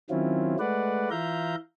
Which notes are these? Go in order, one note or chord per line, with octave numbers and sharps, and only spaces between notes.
D#3 F#3 C4 C#4 E4 F4
G#3 A3 B4 D5 F#5
E3 F4 E5 F5 A#5 G6